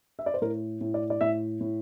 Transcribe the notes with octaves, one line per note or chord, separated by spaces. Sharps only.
E5
D5
C5
A2 A#4
A2
D5
D5
A2 E5
A2